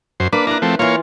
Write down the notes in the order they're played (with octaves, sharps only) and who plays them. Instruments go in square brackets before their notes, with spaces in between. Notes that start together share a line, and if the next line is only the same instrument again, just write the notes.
[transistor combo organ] F#2 C5
[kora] A#3 [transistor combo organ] D4 B4
[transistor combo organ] D4 A#5 [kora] E4 B4
[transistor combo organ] F3 A3 C4
[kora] E3 F4 [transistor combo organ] A#3 C#5 F5